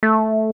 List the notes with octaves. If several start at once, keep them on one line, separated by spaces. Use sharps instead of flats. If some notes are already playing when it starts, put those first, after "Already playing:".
A3